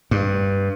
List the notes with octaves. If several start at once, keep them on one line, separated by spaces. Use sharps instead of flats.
G2